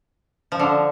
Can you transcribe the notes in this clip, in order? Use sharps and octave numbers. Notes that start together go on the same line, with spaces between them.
F3
D3